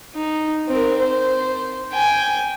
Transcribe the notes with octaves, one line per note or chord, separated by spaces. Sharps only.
D#4
C4 A#4
C5
G5 G#5